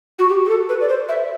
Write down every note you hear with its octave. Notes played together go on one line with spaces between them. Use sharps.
F#4
G4
G4
A4
B4
D5
C5
E5